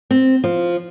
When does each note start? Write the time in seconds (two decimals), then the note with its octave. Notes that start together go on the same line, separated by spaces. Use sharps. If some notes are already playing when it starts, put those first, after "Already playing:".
0.11 C4
0.44 F3